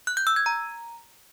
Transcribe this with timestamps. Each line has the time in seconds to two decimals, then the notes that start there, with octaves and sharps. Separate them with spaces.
0.07 F#6
0.17 G6
0.27 E6
0.36 G#6
0.46 A#5